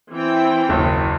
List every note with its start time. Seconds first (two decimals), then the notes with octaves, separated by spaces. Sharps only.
0.12 E3 C4 G5
0.69 F#1 D#2 E4